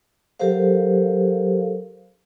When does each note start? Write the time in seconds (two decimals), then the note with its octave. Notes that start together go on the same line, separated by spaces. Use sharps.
0.39 F#3 G4 A4 A#4 C5 F5